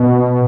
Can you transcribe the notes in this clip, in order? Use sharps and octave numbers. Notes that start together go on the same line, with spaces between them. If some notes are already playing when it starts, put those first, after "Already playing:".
Already playing: B2